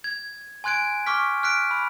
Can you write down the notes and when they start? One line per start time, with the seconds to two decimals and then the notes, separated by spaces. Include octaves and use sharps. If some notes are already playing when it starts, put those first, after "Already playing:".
0.04 G#6
0.64 G#5 C6 F#6 G#6 D7
1.06 C#6 D6 F6 B6
1.43 F6 F#6 B6 D7
1.71 B5